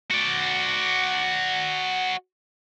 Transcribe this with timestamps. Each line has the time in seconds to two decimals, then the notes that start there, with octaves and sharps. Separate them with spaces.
0.11 F#4 D5